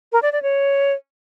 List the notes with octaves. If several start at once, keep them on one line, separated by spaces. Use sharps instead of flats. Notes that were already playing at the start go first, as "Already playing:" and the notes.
A#4
D5
D5
C#5